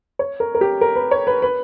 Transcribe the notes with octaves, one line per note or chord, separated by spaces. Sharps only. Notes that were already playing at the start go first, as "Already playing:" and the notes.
C#5
A#4
A#4
G4
A#4
B4
C#5
B4
B4